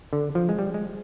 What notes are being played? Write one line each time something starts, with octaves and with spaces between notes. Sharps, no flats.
D3
F3
G#3
G3
G#3